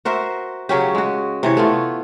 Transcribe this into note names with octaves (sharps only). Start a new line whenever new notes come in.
F#4 A#4 C5 E5
C#3 F#3 C#4 G4
G#3 F#4
C3 E3 C#5
A3 B3 F4